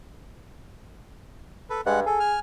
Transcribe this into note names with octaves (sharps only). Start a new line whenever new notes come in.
A4 B4
G2 G#3 F#5
G#4 A4
G#5 F6